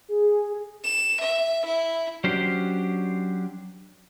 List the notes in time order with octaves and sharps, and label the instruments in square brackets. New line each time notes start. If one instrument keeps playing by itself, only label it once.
[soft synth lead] G#4
[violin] E7
E5
E4
[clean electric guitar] F#3 C#4 D4 G4 C5